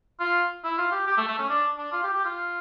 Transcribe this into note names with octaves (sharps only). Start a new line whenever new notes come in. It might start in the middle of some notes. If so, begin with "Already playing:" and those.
F4
E4
F4
G4
G4
A3
A3
C#4
D4
D4
F4
G4
G4
F4